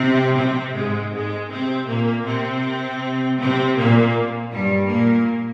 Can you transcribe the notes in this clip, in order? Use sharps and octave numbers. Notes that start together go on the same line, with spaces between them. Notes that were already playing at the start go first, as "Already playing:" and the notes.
Already playing: C3 C4
C3 C4
G#2 G#3
G#2 G#3
C3 C4
A#2 A#3
C3 C4
C3 C4
A#2 A#3
G2 G3
A#2 A#3